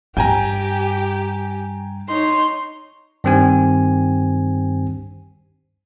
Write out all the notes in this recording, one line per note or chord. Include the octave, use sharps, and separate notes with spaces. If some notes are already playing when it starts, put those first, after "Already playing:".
G2 G4 G5 G#5 A#5
D#4 C#5 C6
G2 D#3 C4 G4 G#5